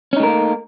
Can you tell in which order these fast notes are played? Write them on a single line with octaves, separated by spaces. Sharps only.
C#4 D#4 A3 A#4 A#3